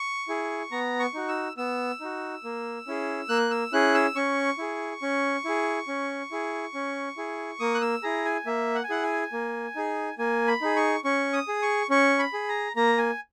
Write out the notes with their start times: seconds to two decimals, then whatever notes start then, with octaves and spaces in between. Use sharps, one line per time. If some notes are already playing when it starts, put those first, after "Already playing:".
Already playing: C#6
0.28 E4 G#4
0.72 B3 A#5
1.00 C#6
1.14 D#4 F#4
1.29 E6
1.57 B3 E6
2.00 D#4 F#4
2.44 A#3
2.87 C#4 E4 G#4
3.29 A#3 F#6
3.50 E6
3.73 C#4 E4 G#4 F#6
3.94 E6
4.15 C#4 C#6
4.58 E4 G#4
5.02 C#4
5.45 E4 G#4
5.88 C#4
6.31 E4 G#4
6.74 C#4
7.17 E4 G#4
7.60 A#3 D#6
7.75 F#6
7.81 E6
8.03 E4 G#4 A#5
8.25 G#5
8.46 A#3 E5
8.75 F#5
8.84 G#5
8.90 E4 G#4 F#5
9.03 G#5
9.32 A#3
9.76 D#4 G#4
10.19 A#3 G#5
10.47 B5
10.61 D#4 G#4
10.76 C#6
11.04 C#4 C#6
11.33 D#6
11.48 G#4
11.62 C#6
11.90 C#4 C#6
12.19 B5
12.33 G#4
12.49 A#5
12.76 A#3 A#5
12.98 G#5